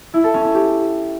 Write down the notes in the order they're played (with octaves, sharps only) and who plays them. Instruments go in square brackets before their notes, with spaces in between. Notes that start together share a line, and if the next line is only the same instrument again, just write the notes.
[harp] E4
A4
C#4
C#4
G4